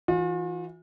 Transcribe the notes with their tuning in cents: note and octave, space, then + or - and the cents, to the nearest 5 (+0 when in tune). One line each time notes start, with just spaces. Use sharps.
E3 +0 F4 +45